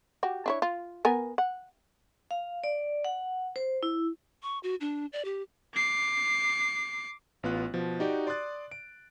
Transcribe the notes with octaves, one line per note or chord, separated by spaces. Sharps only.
F#4 G4
D4 E4 C#5
F4
B3 A#4 G#5
F#5
F5
D5
F#5
C5
E4
C#6
F#4
D4
D5
G4
D6 C7
A1 B3 F4 F#6
B2 F3
D#4 F#4 G4 D5
D5 C6 D6 D#6 F#6 A6
D7